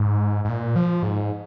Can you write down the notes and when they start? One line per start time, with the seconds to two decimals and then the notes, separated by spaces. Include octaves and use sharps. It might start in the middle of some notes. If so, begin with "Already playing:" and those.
Already playing: G#2
0.45 G#2
0.49 A#2
0.76 F3
1.03 G#2